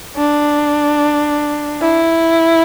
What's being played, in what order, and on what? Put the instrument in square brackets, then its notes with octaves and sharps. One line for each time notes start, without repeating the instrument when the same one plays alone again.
[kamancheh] D4
E4